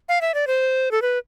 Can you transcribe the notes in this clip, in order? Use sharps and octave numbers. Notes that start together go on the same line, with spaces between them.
F5
E5
D5
C5
A4
B4